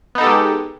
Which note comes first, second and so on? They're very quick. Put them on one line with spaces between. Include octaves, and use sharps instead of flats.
B3 D#4 A4 G4 G#3